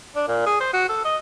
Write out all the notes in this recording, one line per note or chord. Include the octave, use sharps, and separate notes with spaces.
D4
A#2
G#4
C5
F#4
A4
D#5